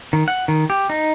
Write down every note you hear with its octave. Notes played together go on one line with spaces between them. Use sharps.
D#3
F#5
D#3
G4
D#4